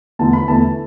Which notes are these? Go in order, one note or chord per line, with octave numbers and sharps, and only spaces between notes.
E2 D3 A3 E4 A5
B5
E2 D3 A3 E4 A5